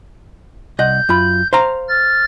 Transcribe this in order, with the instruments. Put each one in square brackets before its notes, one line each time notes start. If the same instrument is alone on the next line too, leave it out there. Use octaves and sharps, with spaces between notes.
[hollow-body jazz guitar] C2 D#5 F#5 [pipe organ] G6
[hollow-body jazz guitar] F#2 F4 B5
C5 F5 A#5
[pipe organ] F6 A6